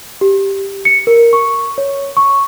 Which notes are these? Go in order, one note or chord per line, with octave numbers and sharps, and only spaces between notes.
G4
C#7
A#4
C#6
C#5
C#6